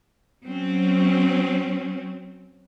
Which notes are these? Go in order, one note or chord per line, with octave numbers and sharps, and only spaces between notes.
F#3 C4 C#4